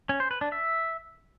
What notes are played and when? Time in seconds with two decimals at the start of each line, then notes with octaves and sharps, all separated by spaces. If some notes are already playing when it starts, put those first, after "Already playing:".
0.09 C#4
0.20 C5
0.31 B4
0.41 D4
0.52 E5